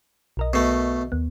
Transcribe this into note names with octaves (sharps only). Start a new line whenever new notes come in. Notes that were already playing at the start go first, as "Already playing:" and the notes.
B1 A#4 D#5
B2 A3
D#2 B3